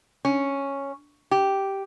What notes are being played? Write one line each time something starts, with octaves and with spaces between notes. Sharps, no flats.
C#4
G4